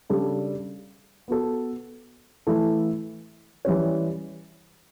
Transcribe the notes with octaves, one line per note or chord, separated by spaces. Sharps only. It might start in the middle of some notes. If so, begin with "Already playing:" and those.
C#3 G3 D4 A4
B3 F#4 A4
E3 A3 E4 A4
E3 G3 C#4